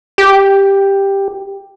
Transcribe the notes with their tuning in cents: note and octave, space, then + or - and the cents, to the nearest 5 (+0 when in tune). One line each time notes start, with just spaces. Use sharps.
G4 +5